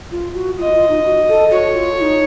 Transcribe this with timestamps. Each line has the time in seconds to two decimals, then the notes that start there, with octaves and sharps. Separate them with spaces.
0.11 F4
0.35 F#4
0.58 F4 D#5
0.74 F4
0.89 D#4
1.05 F#4
1.28 A4
1.51 F#4 C#5
1.73 F4
1.98 F4
2.02 D#4